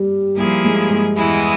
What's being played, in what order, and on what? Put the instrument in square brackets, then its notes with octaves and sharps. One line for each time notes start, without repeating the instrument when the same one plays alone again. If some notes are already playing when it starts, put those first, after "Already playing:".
Already playing: [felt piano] G3
[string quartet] F3 A#3 E4 G#4 [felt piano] G3
[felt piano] G#3
G#3
[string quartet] E2 E3 G#3 E4